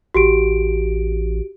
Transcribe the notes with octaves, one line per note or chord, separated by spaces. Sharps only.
A1 F#4 G4 D7